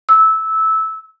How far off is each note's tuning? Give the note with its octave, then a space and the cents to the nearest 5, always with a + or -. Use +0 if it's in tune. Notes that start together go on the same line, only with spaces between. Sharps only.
E6 -15